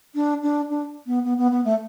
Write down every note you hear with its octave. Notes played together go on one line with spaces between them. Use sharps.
D4
D4
D4
B3
B3
B3
B3
A3